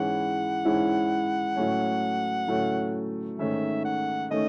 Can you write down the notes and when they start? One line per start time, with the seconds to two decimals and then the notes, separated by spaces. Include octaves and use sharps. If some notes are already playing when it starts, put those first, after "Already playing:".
Already playing: G#2 E3 G#3 C#4 E4 F#5
0.65 G#2 E3 G#3 C#4 E4
1.56 A2 F#3 A3 C#4
2.48 A2 F#3 A3 C#4
3.39 G#2 D#3 A3 C#4 E5
3.85 F#5
4.31 D#3 A3 C#4 D#5